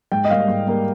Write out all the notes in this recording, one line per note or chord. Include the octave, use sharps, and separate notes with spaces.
G#2 G5
D#5
G3 A#3 F5
G#2
G3 A#3